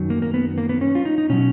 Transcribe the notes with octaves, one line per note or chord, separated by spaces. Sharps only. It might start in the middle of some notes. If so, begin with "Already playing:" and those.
Already playing: F#2 D#3 F#3
A#3
A#3
B3
A#3
B3
C#4
F4
D#4
D#4
B2 F#3 C#4